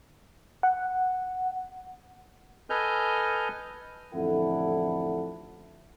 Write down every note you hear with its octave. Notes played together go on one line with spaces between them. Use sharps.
F#5
A4 B4 D#5 G#5 F6 G6
A1 F2 D3 E4 A4 F#5